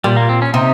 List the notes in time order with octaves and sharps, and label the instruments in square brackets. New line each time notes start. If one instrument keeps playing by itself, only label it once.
[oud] A#2 [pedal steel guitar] G3
[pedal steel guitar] A#3
C4
C#4
[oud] C3 [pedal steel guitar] D#4